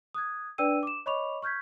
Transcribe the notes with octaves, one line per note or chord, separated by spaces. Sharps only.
D#6 F#6 G#6
D4 B4 D5 G5 E6 D#7
D6 E7
C#5 D#5 B5 C#6 D6 F7
C#6 F6 G6 G#6 B6